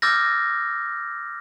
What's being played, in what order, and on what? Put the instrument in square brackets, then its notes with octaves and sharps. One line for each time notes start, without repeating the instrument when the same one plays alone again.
[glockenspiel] D6 E6 F6 G6 A6 A#6